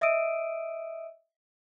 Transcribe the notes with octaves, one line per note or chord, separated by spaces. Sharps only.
D#5 E5 D#6 E6 D7 D#7